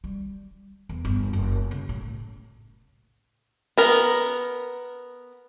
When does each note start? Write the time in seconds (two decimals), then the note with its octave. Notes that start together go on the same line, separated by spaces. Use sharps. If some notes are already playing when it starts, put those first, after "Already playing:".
0.04 G3
0.89 E2
1.05 G1
1.33 F#1
1.71 C#3
1.89 A2
3.78 B3 A#4